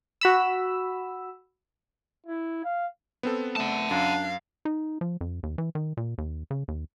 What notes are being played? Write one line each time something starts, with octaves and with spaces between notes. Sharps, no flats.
F#4 B5 E6
E4
F5
B3 C4 A4
A3 F#5 A5
F#2 D4 F5
D#4
F3
F2
D#2
E3
D#3
A#2
D#2
C#3
D#2